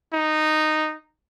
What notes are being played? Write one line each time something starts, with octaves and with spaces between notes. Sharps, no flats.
D#4